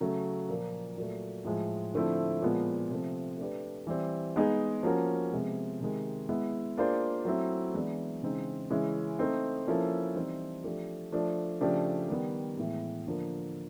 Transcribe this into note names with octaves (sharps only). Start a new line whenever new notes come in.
C#3 F#3 A3
A#2 F3 A#3
A#2 F#3 A3
A2 F3 G#3
D3 F3 A3 C4 E4
A#2 F3 G#3 B3
C3 F3 A3 C4
A3 D4 G4 B4
E3 G3 C4
G#3 B3 D#4 G#4
F3 A#3 C#4 F#4 A#4
C3 F3 G#3 B3
C3 D#3 G#3
G#3 B3 E4
A#3 D4 F4 G#4 C5
F#3 A3 C4 E4
E3 G#3 B3 D4
C#3 E3 G#3 C4 D#4
C#3 E3 G#3 C#4 E4
A3 C4 D#4
F3 A#3 C#4 E4 A4
E3 G3 C4 D#4
F3 A3 D4 G4
F3 A3 D4
C#3 F3 A3 D4 G4
D#3 G3 B3
A2 E3 G#3 B3
D3 F3 A#3